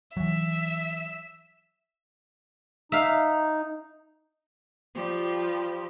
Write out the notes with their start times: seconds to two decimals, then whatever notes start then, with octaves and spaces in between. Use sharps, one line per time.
0.17 E3 F#3 E5
2.92 D#4 E5 F5
4.94 F3 G3 G4